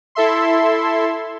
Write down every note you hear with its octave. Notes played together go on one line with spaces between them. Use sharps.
E4 A4 E5 C6